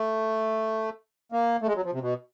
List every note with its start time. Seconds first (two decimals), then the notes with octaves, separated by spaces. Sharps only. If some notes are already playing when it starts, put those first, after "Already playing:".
Already playing: A3
1.32 A#3
1.62 A3
1.67 G#3
1.75 F#3
1.85 F3
1.93 C3
2.01 B2